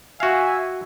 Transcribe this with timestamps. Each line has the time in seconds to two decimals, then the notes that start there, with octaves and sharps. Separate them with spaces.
0.20 F#4 E5 F5 G#5